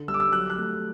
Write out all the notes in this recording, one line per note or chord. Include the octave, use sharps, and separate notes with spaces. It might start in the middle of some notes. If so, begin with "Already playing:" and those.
Already playing: D3
G3 E6
D6
E6
F#3 F#6
F#6
A3